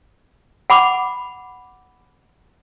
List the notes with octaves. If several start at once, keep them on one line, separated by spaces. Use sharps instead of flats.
F#5 B5 D6